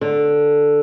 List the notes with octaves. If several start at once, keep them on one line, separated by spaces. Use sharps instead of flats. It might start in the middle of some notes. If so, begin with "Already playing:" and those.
D3